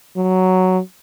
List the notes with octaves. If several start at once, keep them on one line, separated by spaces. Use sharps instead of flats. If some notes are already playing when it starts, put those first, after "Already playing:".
F#3